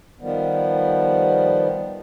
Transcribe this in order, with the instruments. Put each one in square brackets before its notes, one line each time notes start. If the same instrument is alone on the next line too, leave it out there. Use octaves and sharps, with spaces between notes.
[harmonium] D#3 F3 G3 B3